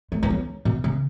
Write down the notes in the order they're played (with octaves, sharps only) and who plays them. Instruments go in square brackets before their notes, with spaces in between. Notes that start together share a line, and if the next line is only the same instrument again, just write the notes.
[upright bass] A3
E3
F#3
B2
C#3